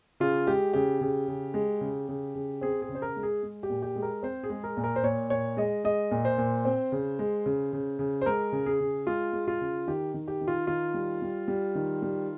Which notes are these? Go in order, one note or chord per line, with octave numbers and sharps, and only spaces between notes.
C#3 F4
G#3 G4
C#3 G4
C#3
C#3
G#3
C#3
C#3
C#3
C4 G#4
G#4
C#3
C5
A#4
G#3
G#4
G#3
G4
A#2
G4
G#3
A#4
C4 C5
G#4
G#3
A#4
A#2
A#4
C5
A#2 C#5
A#2 C#5
G#3 D#5
G#3 D#5
A#2
C5
A#2
C4
C#3
G#3
C#3
C#3
C#3
C5
G#3 A#4
C#3
G#4
C#3
G#3 F4
G#3
F4
C#3
D#3 G4
D#3
G4
D#3
F4
D#3 F4
G3
G3
G3
D#3
G3